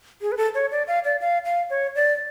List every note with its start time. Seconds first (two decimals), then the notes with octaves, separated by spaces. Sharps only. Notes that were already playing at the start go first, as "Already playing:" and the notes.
0.21 G#4
0.32 B4
0.37 A4
0.55 C#5
0.71 D5
0.88 F5
1.05 D5
1.21 F5
1.45 F5
1.70 C#5
1.95 D5